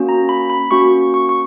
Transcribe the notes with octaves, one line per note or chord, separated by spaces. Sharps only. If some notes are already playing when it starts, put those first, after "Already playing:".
Already playing: A#3 C#4 F#4
A#5
B5
B5
A#3 C#4 F#4 C#6
C#6
C#6